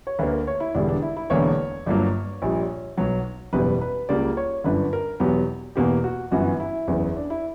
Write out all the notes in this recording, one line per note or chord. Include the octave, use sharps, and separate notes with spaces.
C#5
D2 D3 A#3 B4
A#4
C#5
E4
E1 E2 D3 G3 D4
D4
E4
E4
E1 E2 D3 A#3 C#5
G1 G2 F#3 A#3
A#1 A#2 G3
B1 B2 F#3
F#1 E2 B2 G3 B4
B4
C#2 C#3 G3 A#3 D5
C#5
G1 F#2 D3 B4
A#4
E2 B2 F#3 B3 G4
E2 B2 A#3 G4
F#4
G1 F#2 E3 B3 F#4
E4
F#1 E2 C#3
D4
E4